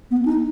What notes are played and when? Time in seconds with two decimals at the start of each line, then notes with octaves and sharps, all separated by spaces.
0.11 B3
0.25 D#4